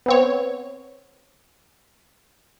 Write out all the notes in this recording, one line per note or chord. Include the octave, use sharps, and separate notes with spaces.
B3 C4 C#5